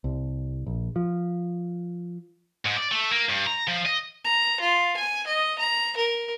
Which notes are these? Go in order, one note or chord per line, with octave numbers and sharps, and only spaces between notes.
C2
A#1
F3
G#2
D5
A3
A#3
G2
A#5
F3
D#5
A#5
F4
G#5
D#5
A#5
A#4